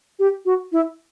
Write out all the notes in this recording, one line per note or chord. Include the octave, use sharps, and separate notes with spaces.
G4
F#4
E4